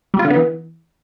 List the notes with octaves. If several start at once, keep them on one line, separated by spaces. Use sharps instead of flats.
G3
F4
D3
B3
E3